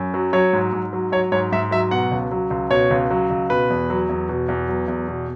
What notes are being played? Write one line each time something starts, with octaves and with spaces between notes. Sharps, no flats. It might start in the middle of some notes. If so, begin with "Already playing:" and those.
Already playing: F#2
F#3
F#3 C#5
G#2
G#2
F#3
F#3 C#5
G#2 C#5
G#2 E5
F#3 E5
B2 F#5
C#2
F#3
C#2
B2 C#5
C#2
F#3
C#2
B2 B4
E2
F#3
E2
B2
E2
F#3
E2
B2